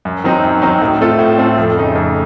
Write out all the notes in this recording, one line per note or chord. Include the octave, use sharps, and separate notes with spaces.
F#2
D#3 F#3 C4 D#4
F#2
D#3 F#3 C4 D#4
A2
A3 C4 F4 A4
A2
A3 C4 F4 A4
F2
C#3 A3 D#4
F2